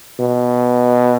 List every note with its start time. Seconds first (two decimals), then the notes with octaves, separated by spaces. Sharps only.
0.19 B2